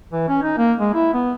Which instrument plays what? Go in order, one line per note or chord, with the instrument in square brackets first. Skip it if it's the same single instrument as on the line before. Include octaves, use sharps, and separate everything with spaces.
[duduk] E3
C#4
D#4
A#3
G#3
E4
B3